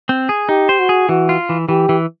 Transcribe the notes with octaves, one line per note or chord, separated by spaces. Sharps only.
C4
G#4
D#4 G4
C5
F#4
G#4
E3 F#4
F4
E3
E3 G4
E3